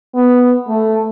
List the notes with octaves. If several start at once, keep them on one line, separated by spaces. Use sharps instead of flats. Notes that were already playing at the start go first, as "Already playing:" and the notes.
B3
A3